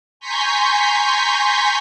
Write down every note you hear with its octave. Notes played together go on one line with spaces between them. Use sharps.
G#5 A#5 C6 C#6 G6 B6